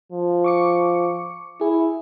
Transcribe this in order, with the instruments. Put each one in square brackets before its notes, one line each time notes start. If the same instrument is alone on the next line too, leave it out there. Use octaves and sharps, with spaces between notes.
[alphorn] F3
[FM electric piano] C#6 D6 C#7
[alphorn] E4 [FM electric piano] G#4